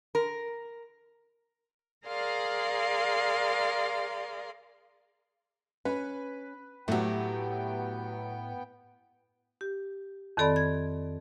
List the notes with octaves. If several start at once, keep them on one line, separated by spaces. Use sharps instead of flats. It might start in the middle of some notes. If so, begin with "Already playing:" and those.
A#4
G#4 A#4 D5 F5 C6
C#4 B4
A2 F#3 A3 B3 F#4 G4 G5
G4
F2 D#3 C4 A4 D5 B5
G#6